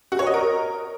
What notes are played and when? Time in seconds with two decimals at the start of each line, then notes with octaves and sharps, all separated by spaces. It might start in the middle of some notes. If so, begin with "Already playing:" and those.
0.12 F#4
0.19 C#5
0.26 D#5
0.34 A#4